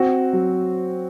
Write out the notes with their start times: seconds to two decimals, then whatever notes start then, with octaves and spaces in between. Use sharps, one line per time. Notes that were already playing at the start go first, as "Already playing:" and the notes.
Already playing: C4 F#4
0.33 F#3